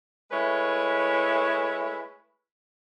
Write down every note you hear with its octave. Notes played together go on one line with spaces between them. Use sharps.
G#3 A3 E4 B4 C#5